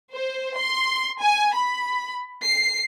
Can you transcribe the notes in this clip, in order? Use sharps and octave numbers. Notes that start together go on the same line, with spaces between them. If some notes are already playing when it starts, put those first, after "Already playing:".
C5
C6
G#5
B5
C7